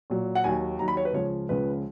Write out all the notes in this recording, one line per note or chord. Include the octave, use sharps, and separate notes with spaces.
A#2 F#3
F#5
D#2 D#3 F#3 G#5
D#2 D#3 F#3 A#5
B5
C#5
B4
C#2 C#3 F3 C#5
C#2 C#3 F3 B4